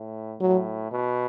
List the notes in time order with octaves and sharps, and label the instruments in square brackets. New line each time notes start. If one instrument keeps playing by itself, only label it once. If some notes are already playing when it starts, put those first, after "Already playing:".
Already playing: [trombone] A2
[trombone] A2 [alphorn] F#3
[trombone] B2